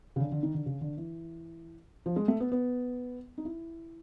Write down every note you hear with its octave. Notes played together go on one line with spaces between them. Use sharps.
C#3
D3
D3
D#3
D3
C#3
D3
E3
F3
G#3
A3
B3
B3
D#4
E4